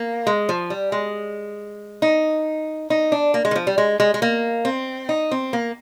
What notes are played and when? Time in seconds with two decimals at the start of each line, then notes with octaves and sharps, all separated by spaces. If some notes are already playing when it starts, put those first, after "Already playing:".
Already playing: A#3
0.27 G#3
0.49 F3
0.70 G3
0.92 G#3
2.02 D#4
2.90 D#4
3.12 D4
3.34 A#3
3.45 G#3
3.51 D#3
3.55 F3
3.67 G3
3.78 G#3
4.00 G#3
4.14 G#3
4.22 A#3
4.65 C4
5.09 D#4
5.31 C4
5.53 A#3